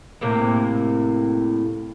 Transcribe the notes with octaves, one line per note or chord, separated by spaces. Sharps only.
A2 C3 A#3